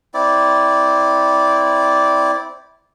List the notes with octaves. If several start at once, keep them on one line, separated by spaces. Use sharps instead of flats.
C4 E4 D5